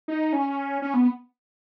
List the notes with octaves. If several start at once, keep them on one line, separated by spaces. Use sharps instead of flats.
D#4
C#4
C#4
B3